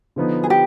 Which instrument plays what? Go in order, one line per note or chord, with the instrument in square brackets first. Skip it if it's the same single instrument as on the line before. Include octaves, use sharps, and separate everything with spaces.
[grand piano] D3 F3 B3 D#4
[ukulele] G#4
G4